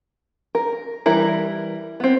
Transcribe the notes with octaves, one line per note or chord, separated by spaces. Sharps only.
A#4
E3 G3 E4 A#4
B3 C4